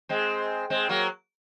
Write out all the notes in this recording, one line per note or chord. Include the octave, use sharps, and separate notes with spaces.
G#3 C4
G#3 C4
F#3 A#3